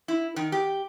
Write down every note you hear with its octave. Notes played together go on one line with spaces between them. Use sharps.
E4
D#3
G4